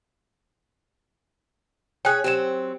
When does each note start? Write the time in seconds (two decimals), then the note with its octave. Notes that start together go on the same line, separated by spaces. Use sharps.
2.05 C#4 G#4 G5 G#5 F#6
2.24 F#3 C4 G4 E7